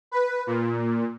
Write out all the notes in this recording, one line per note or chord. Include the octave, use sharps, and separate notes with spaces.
B4
A#2